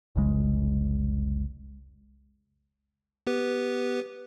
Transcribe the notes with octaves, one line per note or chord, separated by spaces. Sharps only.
F1 C2 C#3 G#3
B3 G4 B4